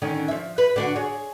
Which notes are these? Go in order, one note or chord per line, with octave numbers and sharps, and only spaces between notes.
D3 D#3 C#4
F3 E5
B4
D3 D4 F#4
G#4 C#5